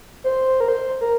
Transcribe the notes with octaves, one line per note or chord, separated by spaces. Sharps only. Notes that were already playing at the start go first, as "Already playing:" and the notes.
C5
A#4
C5
A#4